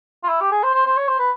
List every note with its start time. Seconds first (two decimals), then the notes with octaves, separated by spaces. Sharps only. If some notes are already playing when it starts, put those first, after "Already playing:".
0.23 F4
0.29 E4
0.41 G4
0.51 G#4
0.63 C5
0.73 C5
0.86 C5
0.97 C#5
1.08 C5
1.19 B4